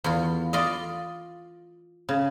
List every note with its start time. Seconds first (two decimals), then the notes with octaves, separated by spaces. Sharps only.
0.04 E2 F4
0.53 F4 D5 D#5
2.09 C#3